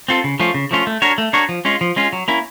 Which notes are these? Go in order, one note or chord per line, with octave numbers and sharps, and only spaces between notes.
C4 F4 A4
C#3
F3 A3 C#4 F4
C#3
F3 A3 C#4 F4
A3
D4 F#4 A#4 C#5
A3
D4 F#4 A#4 C#5
F3
G#3 C#4 F4
F3
G#3 C#4 F4
F#3
A#3 C#4 E4